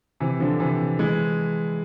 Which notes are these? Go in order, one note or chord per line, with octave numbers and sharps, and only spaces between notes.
C3 E3
D3 F3
C3 E3
E3 G#3